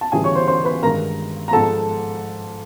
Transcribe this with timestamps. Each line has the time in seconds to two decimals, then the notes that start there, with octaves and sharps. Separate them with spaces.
0.01 A5
0.12 D2 C#3 E3 G3 G#4 G#5
0.24 C#5 C#6
0.35 C5 C6
0.48 C5 C6
0.65 B4 B5
0.82 G2 D#3 G#3 A#4 A#5
1.48 A#5
1.52 G#2 F3 G#3 A4 A5